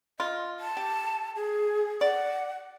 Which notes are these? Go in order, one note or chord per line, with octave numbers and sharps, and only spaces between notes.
F4 D#5
A5
G4
G#4
D5 F#5